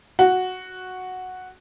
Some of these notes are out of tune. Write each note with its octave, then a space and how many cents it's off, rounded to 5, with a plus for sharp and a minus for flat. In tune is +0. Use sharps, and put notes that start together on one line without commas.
F#4 -5